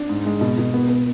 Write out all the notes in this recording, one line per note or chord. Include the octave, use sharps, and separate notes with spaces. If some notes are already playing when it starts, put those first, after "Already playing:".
Already playing: D4
G#2
G#3
B2
B2
B3
B3